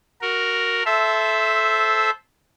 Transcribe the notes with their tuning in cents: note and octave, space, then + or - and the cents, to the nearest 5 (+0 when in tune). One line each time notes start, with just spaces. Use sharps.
F#4 +0 A#4 +0
A4 -20 C5 +0 E5 +0